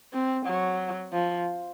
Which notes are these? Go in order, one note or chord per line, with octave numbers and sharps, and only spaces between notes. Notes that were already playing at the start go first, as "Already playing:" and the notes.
C4
F#3
F3